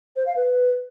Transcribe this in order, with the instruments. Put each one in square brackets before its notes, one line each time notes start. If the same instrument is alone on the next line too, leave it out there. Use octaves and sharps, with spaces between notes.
[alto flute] C5
F5
B4